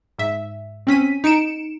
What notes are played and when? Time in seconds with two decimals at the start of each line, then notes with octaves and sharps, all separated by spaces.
0.18 G#2 E5
0.87 C4 C#4 B6 D#7
1.24 D#4 C#7 D7 E7